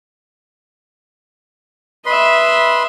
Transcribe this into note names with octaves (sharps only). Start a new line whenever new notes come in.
B4 D#5 E5 B5 C6